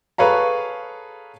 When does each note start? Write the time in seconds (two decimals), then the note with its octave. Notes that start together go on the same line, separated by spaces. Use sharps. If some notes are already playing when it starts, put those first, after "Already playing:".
0.18 G#4 A4 B4 C#5 F5 A#5